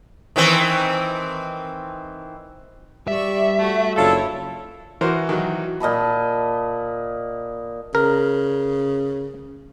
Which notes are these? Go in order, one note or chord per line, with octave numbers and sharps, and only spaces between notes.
D#3 E3 C4
G3 D5 E5 C#6
A3 F#4
F#1 D4 E4 F4 A4 C#5
E3 F#4 A#4 C5
D#3 F#3
A#2 D#5 A5 B5
C#3 A#4